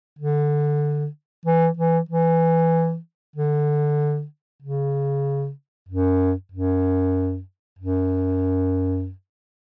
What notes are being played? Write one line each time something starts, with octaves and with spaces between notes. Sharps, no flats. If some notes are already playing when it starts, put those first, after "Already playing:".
D3
E3
E3
E3
D3
C#3
F#2
F#2
F#2